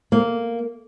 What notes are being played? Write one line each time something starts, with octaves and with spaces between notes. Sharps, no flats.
A#3